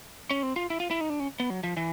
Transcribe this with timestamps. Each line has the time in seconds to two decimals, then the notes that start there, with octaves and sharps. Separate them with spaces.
0.31 C#4
0.43 C4
0.56 F4
0.70 E4
0.80 F4
0.91 E4
1.01 D#4
1.10 D4
1.20 C#4
1.40 B3
1.50 F#3
1.64 F3
1.77 E3